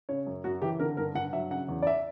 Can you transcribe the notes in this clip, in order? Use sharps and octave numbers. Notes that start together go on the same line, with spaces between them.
C#3 C#5
F#2
F#2 F#4
E3 G4
D3 A#4
G2 A#4
G2 F#5
F#3 E5
C#3 F#5
E2
D5
E5